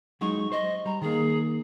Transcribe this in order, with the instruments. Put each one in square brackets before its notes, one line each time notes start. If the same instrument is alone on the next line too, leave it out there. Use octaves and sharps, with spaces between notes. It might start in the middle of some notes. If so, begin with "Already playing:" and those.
[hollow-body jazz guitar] F#3 G#3 D#4 [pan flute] C#6
[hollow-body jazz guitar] C5 [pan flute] D#5
[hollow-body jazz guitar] G3 [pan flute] A#5
[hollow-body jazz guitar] D#3 A#3 [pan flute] G#4